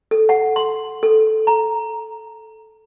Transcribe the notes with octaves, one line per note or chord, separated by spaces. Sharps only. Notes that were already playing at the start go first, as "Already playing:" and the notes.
A4
F#5
C6
A4
A#5